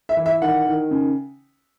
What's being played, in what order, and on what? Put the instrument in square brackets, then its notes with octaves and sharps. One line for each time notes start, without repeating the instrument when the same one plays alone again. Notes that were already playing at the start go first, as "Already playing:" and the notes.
[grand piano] E5
E3
E5
D#3 F#5
D#3
C#3